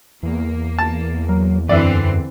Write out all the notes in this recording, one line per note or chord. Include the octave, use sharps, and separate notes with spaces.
E2 A#3
A5
F#3 A#4
F#2 D3 E3 C4 D5 E5